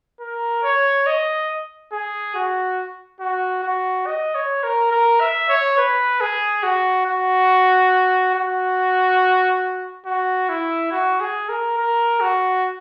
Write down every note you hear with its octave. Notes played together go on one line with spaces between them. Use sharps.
A#4
C#5
D#5
G#4
F#4
F#4
F#4
D#5
C#5
A#4
A#4
E5
C#5
B4
G#4
F#4
F#4
F#4
F#4
E4
F#4
G#4
A#4
A#4
F#4